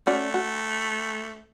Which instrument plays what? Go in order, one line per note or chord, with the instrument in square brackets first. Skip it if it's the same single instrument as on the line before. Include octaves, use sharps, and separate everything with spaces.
[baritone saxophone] A3 [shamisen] C#4 F#4 D5
[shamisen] F#4